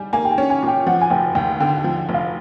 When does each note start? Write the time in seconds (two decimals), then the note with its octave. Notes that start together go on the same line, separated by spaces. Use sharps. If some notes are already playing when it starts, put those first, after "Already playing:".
Already playing: G3 G#5
0.13 A#3 G#5
0.25 G5
0.31 G#5
0.38 C#4
0.50 G#5
0.63 A#2 G5
0.86 F3 F#5
1.01 G#5
1.10 F1 G5
1.35 D#2 G5
1.60 D3 G5
1.78 G5
1.84 F3
2.09 F1
2.14 F5